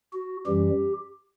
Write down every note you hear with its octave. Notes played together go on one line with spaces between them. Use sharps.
F#4
F#2 E3 G3 G4